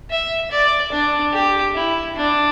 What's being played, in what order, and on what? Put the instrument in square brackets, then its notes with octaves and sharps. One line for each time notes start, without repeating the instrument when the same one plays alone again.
[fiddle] E5
D5
D4
G4
E4
D4